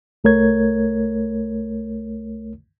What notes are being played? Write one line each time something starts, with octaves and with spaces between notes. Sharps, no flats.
C2 A3 A#4 C#5 G#6